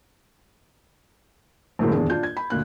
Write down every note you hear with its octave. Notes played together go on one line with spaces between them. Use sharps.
A#1 F#2 A2 D3 G#3
D#1 E2 D4 G#4
D4 F4 G6
G#6
B5
D2 A#2 F#6